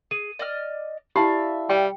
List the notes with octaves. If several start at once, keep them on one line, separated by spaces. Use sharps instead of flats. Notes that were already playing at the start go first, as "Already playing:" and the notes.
G#4 D#7
D5 D#5 F6
E4 G4 D5 E5 F5 A5 B5
G3 G5